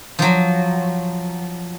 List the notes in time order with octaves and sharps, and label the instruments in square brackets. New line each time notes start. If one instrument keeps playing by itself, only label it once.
[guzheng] F3 F#3